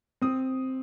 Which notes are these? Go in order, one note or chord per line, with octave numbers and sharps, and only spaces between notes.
C4 D#6